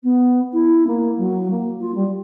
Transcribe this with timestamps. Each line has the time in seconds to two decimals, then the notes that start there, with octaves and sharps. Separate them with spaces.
0.03 B3
0.53 E4
0.87 A#3
1.17 F#3
1.50 A#3
1.80 F4
1.94 G3